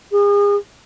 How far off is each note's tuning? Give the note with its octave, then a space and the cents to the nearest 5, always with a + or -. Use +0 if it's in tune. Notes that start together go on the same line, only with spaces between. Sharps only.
G#4 -35